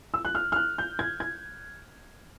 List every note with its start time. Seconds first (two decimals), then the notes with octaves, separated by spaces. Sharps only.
0.14 E6
0.25 F#6
0.35 F6
0.52 F6
0.56 F#6
0.78 G6
0.99 G#6
1.20 G#6